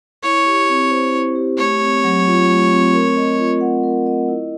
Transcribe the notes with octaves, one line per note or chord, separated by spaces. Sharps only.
E4 C#5
G4
C4
C5
E4
G4
A3 C#5
C4
F#3
F4
A3
C4
A#4
D#5
F4
F#5
A#4
D#5
E4